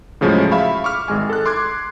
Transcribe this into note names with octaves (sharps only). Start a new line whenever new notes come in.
A2 C#3 F3 F#3 G#3 A3
E5 F5 B5 C#6
C#6 D6 F6
G#1 G#3 G#5
A4 F#6
C6 D6 F#6 G#6